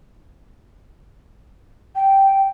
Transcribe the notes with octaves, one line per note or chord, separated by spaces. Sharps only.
G5